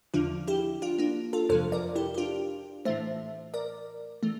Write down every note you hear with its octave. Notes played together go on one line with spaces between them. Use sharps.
E2 D3 F3 D4 F4
E4 G4
D4 F4
A#3 D4
F4 A4
F2 C3 F3 A4 C5
A#4 D5
E4 G4
G4
D4 F4
A2 E3 A3 C5 E5
A#4 D5
E3 A3